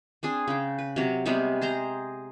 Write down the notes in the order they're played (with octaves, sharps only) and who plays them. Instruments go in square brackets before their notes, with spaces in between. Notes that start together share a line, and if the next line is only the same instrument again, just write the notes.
[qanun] C4 D4 G#4
C#3 G5
B4
C3 F#3
C3 G3 G#3 B3
G#4 C5 A#5